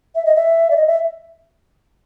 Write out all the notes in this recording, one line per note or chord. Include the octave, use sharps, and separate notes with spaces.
E5
D#5
E5
D5
D#5
E5